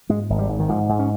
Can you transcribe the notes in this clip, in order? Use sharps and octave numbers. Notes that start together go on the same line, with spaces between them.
G#2 G#3
G#1
G3
G#2
D#3
G#2 F3
G#2
C#4